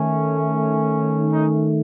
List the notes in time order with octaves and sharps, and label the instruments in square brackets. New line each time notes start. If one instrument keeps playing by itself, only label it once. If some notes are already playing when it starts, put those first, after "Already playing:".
Already playing: [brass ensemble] D#3 A3 C#4
D#4